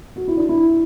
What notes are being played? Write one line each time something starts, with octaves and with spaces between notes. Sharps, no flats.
F#4
E4
D4
E4